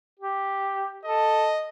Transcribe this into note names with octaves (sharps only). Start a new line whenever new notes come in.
G4
A4 D#5